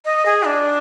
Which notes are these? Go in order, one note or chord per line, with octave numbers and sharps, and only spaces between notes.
D#5
G#4
D4